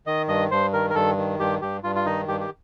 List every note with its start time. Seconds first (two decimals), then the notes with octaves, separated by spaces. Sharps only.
0.07 D#3 D#5
0.29 G2 D#5
0.51 G2 C5
0.73 D#3 A#4
0.90 A#4
0.95 G2 A4
1.17 D#3
1.39 G2 G4
1.62 G2 G4
1.84 G2 F4
1.95 F4
2.06 D#3 D#4
2.28 G2 G4
2.40 G4